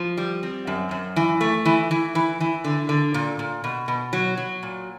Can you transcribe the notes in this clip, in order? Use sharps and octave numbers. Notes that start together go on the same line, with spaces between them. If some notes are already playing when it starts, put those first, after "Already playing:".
Already playing: F3
G3
C4
F#2
F#2
E3
A3
E3
E3
E3
E3
D3
D3
A#2
A#2
B2
B2
F#3
F#3
A#2